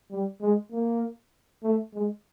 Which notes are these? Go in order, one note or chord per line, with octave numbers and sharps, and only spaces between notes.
G3
G#3
A#3
A3
G#3